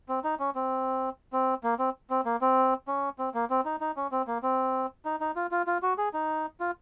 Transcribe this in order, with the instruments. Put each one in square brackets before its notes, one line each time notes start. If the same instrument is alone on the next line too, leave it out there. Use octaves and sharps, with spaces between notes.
[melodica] C4
D#4
C#4
C4
C4
A#3
C4
C4
A#3
C4
C#4
C4
A#3
C4
D#4
D#4
C#4
C4
A#3
C4
D#4
D#4
F4
F4
F4
F#4
G#4
D#4
F4